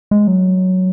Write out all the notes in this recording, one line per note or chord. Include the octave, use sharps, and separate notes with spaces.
G#3
F#3